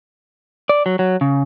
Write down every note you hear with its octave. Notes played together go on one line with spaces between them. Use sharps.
D5
F#3
F#3
C#3